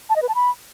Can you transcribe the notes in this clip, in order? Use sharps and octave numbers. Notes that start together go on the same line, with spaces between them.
A5
D#5
B4
A5
B5